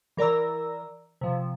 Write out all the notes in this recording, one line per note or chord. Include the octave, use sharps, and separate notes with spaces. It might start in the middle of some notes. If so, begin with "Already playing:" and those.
E3 A#4 D5 A#5 E6
C3 F3